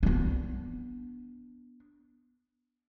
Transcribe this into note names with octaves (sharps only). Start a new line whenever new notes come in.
B3 D4